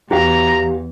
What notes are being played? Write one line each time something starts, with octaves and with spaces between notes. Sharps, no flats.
E2 F#4 G4 F5 A#5